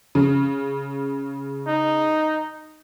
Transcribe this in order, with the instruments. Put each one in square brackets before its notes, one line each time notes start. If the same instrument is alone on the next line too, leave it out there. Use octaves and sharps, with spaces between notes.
[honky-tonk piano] C#3
[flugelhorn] D#4